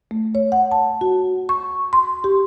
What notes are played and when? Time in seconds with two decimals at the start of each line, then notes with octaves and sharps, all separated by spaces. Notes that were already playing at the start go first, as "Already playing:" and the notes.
0.11 A3
0.35 C#5
0.52 F#5
0.72 A5
1.01 F#4
1.49 C#6
1.93 C6
2.24 G4